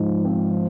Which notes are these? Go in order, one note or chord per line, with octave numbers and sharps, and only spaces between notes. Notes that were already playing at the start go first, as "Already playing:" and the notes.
Already playing: G#2 F3
C4